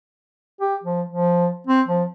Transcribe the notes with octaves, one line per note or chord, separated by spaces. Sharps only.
G4
F3
F3
C4
F3